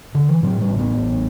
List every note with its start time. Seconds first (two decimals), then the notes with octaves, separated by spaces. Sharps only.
0.15 D3
0.29 E3
0.43 A2 F#3
0.61 G3
0.69 A1
0.79 B3
0.96 A1